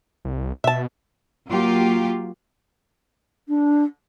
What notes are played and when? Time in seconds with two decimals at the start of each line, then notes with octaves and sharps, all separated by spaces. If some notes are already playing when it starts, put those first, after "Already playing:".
0.25 C2
0.64 B2 E5 A5
1.49 F#3 A#3 F4 G4
3.48 D4